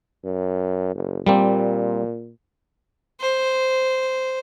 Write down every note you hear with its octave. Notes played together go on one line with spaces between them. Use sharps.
F#2
F#1
A#2 G3 A#3 C4
C5